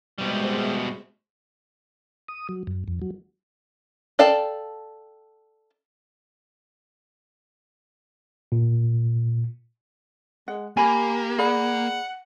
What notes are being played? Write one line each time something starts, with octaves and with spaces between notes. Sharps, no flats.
B2 G3 G#3 C5 E5
D#6
F#3
F#2
F2
F#3
A4 D5 F5 G5 A5
A#2
G#3 F#5
A#3 G4 G#5 B5
G#4 D5 F#5 B5